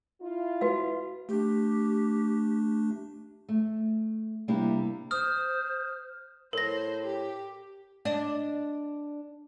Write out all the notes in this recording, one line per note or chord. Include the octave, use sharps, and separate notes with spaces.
E4 F4
F#4 B4 F5
A3 D4 G4
A3
C3 G3 A#3 D4 E4 G4
C5 D#6 F6
A2 A#4 C5 A#6
G4
D4 D5 D#5